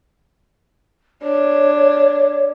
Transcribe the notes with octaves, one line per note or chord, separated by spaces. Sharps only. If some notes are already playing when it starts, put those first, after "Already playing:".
D4 C#5